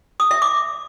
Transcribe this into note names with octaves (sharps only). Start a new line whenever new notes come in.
D#6
E5
D6